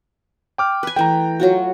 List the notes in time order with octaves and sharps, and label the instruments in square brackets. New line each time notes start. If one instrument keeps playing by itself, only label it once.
[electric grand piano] G5 D6 F6
[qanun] B4 G#5
[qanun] E3 A3 [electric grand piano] G5 A#5
[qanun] F#3 F4 F#4